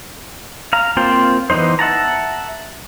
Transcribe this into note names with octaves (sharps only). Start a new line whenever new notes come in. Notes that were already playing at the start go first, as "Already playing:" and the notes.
F5 A#5
A#3 C4 F4 C5 G5
E3 B3 C4 D#4 C5
E5 F#5 A5 A#5